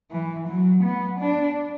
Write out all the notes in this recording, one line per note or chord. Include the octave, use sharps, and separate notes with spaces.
E3
F#3
B3
D4